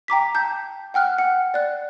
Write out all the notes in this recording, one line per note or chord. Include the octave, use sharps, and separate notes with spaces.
G5 A#5 D6 B6
A5 G6
F#5 G5 F6 F#6
F#5
D5 F#6